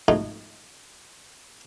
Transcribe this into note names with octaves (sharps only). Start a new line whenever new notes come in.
F2 G#2 B2 A3 D#4